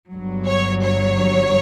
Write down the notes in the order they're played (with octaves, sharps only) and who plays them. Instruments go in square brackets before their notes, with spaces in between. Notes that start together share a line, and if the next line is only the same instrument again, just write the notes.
[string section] G1 G2 F#3
C#5
C#5